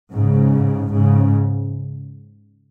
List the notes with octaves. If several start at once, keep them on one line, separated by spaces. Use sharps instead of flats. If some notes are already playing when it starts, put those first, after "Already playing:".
G#2 C#3
G#2 C#3